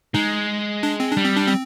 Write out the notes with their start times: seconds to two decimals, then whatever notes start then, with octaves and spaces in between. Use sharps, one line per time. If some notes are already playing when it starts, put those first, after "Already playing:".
0.14 G#3 D#4
0.83 D4
1.00 C4
1.11 D4
1.17 G3
1.24 C4
1.36 D4
1.48 C4